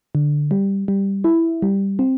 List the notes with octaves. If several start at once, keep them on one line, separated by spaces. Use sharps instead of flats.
D3
G3
G3
E4
G3
C4